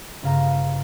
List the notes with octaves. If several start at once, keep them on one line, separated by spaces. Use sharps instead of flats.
G1 C#3 F5 A#5 A#6